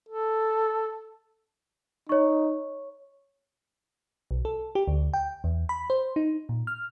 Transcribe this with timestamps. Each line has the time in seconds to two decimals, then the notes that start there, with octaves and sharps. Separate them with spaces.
0.09 A4
2.09 D#4 C#5 C#6
4.31 B1
4.45 A4
4.75 G4
4.88 D2
5.14 G5
5.44 E2
5.69 B5
5.90 C5
6.16 D#4
6.49 A#2
6.67 F6